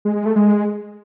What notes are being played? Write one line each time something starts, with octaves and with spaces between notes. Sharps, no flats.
G#3
G#3
A3
G#3